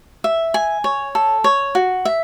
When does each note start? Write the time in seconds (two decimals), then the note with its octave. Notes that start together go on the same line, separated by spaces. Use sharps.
0.24 E5
0.54 G#5
0.84 C#5
1.15 A4
1.44 C#5
1.75 F#4
2.05 E5